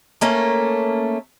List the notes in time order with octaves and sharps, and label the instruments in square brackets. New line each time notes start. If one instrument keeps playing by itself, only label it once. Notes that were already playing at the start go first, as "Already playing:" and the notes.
[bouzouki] A3 A#3 C#4